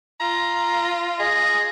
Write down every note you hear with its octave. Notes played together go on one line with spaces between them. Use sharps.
F4 A#5
G#4 D#5